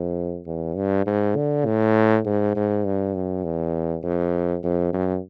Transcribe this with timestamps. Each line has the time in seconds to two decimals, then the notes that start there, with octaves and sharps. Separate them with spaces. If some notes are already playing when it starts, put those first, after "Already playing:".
Already playing: F2
0.46 E2
0.76 G2
1.06 G#2
1.36 D3
1.66 A2
2.25 G#2
2.56 G#2
2.85 G2
3.15 F#2
3.44 E2
4.03 F2
4.63 F2
4.93 F#2